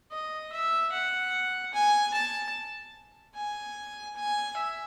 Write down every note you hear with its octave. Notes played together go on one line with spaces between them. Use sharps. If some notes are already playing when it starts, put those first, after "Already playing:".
D#5
E5
F#5
G#5
A5
G#5
G#5
E5